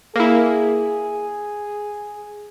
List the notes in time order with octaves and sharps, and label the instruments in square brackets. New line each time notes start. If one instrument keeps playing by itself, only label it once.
[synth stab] A#3 E4 [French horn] G#4